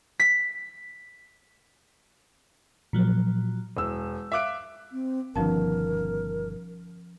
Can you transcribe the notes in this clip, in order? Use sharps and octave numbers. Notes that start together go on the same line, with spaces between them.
B6
A#2 F3 F#3
E1 E6
E5 F5 D6 F#6 D7
C4
G1 B2 D#3 F3 C#4 A#4 A5